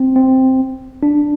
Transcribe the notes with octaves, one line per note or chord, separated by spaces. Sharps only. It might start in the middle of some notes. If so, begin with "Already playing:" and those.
Already playing: C4
C4
D4